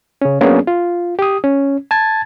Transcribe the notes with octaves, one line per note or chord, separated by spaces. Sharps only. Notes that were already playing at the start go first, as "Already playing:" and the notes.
C#3 C#4
F#3 A#3 B3 C#4 D4 G#4
F4
G4 D#6
C#4
A5 G#6 A6